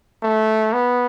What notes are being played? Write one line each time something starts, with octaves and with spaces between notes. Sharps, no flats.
A3
B3